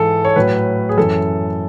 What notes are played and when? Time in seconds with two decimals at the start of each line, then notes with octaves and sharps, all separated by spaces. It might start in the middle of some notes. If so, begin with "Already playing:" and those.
Already playing: G#2 E3 A4
0.25 C#5
0.36 A2 F#3 B4
0.89 G#4
0.97 F#2 E3 A4